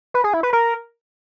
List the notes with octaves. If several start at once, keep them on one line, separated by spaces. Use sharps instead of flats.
B4
G#4
E4
B4
A#4